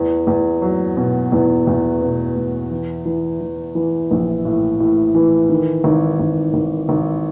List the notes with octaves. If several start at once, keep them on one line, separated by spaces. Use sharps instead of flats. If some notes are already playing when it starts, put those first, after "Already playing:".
Already playing: E2
E2
F#3
B2
E2
E2
B2
E2
E3
E3
E3
E3
A#1
A2
A2
E3
D#3
G#1
G#1
G#1
G#1